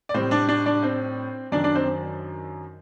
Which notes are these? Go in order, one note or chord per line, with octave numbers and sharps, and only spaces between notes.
D5
A2 G3 C4 C5
D4 D5
D4 D5
D4 D5
C4 C5
F#2 D#3 F#3 D4 D5
D4 D5
C4 C5